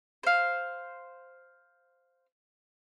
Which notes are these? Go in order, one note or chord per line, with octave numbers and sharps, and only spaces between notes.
C5 F5